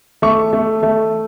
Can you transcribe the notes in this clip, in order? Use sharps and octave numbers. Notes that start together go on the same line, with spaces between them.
A3 C#6
A3
A3